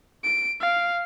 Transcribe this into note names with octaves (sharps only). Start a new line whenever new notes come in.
D7
F5